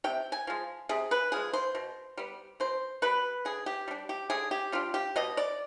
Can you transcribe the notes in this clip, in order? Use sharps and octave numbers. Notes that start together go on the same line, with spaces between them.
C3 G5
G#5
F3 G#3
C3 G#4
B4
F3 G#3 G#4
C5
B2
G3 B3
B2 C5
G3 B3 B4
D3 G#4
G4
G3 D4
G4
D3 G#4
G4
G3 D4 F4
G4
B2 D#5
D5